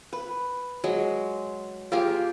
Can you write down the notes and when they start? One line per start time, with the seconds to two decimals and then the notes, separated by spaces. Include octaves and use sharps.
0.13 B4
0.84 F#3 G#3
1.92 A#3 F4 G4 G#4